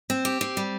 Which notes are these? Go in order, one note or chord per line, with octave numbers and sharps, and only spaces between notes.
C4
G4
C4
G3